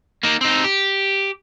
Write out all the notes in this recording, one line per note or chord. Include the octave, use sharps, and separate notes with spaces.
A#3 D#4
C4 D#4
G4